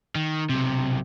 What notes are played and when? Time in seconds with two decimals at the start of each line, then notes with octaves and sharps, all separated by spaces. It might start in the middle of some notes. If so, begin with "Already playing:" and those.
0.15 D#3
0.49 B1 C3